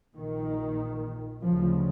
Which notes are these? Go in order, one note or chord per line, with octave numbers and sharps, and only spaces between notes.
A#1 A#2 D#3
D2 C#3 F3